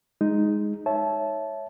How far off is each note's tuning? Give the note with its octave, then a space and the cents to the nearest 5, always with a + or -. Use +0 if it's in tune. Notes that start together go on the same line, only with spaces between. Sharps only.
G#3 +0 D#4 +0
C#5 +0 E5 +0 A5 -20